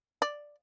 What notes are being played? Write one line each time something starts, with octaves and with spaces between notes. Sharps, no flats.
D5